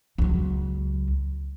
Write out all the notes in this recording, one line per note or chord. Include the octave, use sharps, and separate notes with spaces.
C#2 F#3